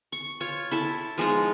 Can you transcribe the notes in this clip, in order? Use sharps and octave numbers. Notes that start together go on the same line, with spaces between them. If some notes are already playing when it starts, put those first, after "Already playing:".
C#6
F4 C#5
E4 A4 A5
F3 G#3 D#4 F4